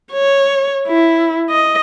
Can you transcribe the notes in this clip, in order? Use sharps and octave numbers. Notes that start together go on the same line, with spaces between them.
C#5
E4
D#5